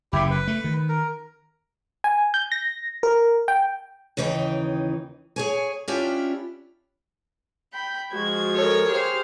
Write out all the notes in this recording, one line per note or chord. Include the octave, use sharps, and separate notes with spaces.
F#1 F#2 C#3 E4 G4
B4
A3
D#3
A#4
G#5
G6
A#6
A#4
G5
D#2 C#3 E3 D#4 G5
G#4 C#5 G#5
C#4 D4 E4 F4 G4
G5 B5 G6
F3 G#3 F#4 G#6
A4 A#4 C#5
G4 G#4 C5 F5